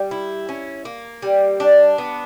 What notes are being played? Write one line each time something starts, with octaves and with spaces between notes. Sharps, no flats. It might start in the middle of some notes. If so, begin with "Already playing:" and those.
Already playing: G3
E4
C#4
A#3
G3
D4
B3